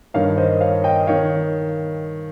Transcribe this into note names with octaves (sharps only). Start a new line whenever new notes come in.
G2 D#3 C#5 F5
C5 D#5
C#5 F5
D#5 G5
D#3 C#5 F5